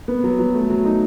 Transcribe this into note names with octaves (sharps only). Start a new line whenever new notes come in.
B3
F#3
F#3
A3
F#3
D#4